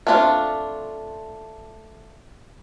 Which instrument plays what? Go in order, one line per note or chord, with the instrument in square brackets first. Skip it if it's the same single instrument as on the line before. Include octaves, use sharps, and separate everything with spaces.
[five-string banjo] A3 C4 D4 E4 F4